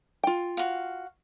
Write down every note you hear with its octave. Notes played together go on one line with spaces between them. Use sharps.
F4 G5
F#4 F5